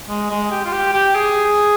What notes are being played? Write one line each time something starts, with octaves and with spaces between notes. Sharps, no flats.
G#3
G#3
G4
F4
G4
G4
G#4